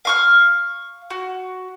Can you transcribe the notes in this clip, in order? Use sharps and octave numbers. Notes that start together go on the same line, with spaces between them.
F5 C#6 F6
F#4